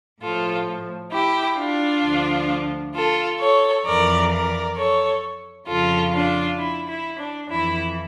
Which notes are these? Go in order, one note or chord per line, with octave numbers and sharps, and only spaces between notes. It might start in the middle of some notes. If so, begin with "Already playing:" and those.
A2 F3 F4 A4
E4 G4
D4 F4
D2 D3 F3
F4 A4
A4 C#5
F2 E3 A#4 D5
A#4 D5
A4 C#5
F2 C#3 F3 F4 A4
D4 F4
E4
E4
D4
F2 E3 E4